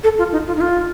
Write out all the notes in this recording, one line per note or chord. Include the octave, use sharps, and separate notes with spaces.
A4
F4
D#4
F4
D#4
F4